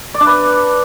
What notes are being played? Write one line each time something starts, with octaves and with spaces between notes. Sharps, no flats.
D5
D4
B4